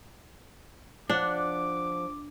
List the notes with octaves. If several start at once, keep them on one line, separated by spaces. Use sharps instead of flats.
F3 D4 F#5 D6